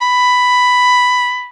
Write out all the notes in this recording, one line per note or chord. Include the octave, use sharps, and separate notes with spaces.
B5